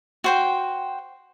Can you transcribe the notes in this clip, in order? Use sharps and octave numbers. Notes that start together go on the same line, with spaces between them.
F#4 C5 G5